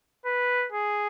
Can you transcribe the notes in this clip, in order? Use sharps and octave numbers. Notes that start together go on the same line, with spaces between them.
B4
G#4